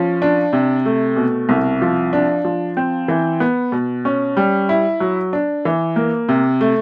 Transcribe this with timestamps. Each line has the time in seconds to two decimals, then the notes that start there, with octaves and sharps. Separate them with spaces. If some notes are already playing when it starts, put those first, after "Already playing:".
Already playing: F3 C#4
0.22 D4
0.53 C3
0.86 A3
1.16 B2
1.49 C2
1.82 F3
2.13 D4
2.45 F3
2.77 C4
3.08 E3
3.40 B3
3.72 B2
4.05 C#4
4.37 G3
4.69 E4
5.00 F#3
5.33 D4
5.65 E3
5.96 A#3
6.29 C3
6.61 A3